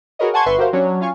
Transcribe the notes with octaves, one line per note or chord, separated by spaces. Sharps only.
F#4 G#4 A#4 B4 C#5 D#5
F#5 G#5 A5 C6 C#6 G#6
G1 B4 E5 C6 C#6
F#4 G4 A#4 C5 F5
F#3 C#4 D4 C#5
C#4 F4 F5 G#5 C#6